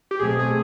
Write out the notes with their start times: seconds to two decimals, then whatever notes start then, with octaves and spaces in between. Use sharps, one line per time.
0.11 G4
0.20 B2 F#3 A3 C4 G#4
0.39 G#4